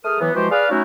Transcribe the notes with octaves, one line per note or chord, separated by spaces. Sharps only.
A3 G#4 A#4 D#6 F6
E3 F#3 B3
E3 F3 G#3 F#4 G4 C5
G#4 B4 D5 F5
F#3 A3 C#4 D#4 E4 F#4